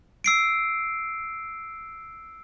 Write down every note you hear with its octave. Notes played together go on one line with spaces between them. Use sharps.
E6 C7 D7